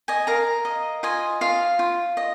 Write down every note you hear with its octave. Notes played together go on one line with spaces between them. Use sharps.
D#5 G#5
A#4 F5 A#5
D#5
F4 D#5 G#5
F4 F5
F4
D#5